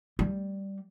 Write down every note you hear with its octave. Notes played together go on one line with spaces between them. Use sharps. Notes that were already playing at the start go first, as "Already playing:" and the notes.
G3